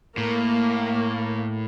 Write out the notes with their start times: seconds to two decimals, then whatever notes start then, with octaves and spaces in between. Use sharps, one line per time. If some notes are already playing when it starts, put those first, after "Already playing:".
0.17 A2 A#3